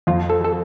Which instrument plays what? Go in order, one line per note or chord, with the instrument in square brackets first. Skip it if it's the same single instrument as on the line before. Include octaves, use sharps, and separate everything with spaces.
[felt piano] F2 [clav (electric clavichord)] F4
[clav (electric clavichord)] A4
A4